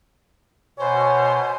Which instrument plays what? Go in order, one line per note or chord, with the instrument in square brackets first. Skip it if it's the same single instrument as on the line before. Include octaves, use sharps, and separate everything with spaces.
[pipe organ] B2 [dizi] C5 [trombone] C#5 [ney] G#5